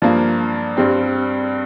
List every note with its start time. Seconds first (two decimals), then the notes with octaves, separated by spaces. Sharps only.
0.02 G2 F3 A#3
0.77 G2 G3 C4